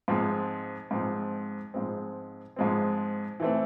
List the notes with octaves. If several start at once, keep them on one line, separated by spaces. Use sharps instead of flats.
G#2 F3 G#3 C4
G#2 F3 G#3 C4
G#2 F3 G#3 C4
G#2 F3 G#3 C4
E3 A3 C4